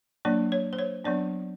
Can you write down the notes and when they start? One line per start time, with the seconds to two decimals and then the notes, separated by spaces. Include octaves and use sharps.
0.25 F#3 A#3 D4 D5
0.52 C#5
0.73 C5
0.79 C#5
1.04 F#3 B3 D4 D5